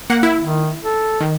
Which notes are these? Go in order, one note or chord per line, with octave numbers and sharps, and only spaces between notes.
A#3 F#5
E4
D#3
A4
D#3